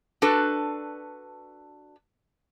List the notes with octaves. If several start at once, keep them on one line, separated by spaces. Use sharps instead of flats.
D4 F#4 A4 B4